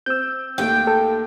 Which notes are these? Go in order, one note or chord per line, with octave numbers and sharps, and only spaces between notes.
C4 E6 G6
D#2 A3 G5
A4